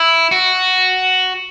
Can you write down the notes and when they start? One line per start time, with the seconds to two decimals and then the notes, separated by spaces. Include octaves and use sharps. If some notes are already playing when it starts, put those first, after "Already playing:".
Already playing: E4
0.31 F#4